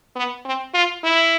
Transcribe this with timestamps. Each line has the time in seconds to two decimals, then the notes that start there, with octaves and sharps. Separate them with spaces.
0.16 B3
0.45 C4
0.74 F4
1.04 E4